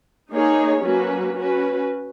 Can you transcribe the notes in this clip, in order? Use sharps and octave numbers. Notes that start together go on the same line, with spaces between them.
A#3 D#4 G#4 C#5
F#3 A#3 C#4 F#4 B4
C#4 F#4 B4